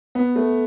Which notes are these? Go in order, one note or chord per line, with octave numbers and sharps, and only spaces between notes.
B3
A3